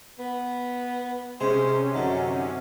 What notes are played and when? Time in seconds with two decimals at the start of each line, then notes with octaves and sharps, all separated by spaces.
0.19 B3
1.41 C3 G#3 C#4 G#4 C5
1.94 F#2 D3 D#4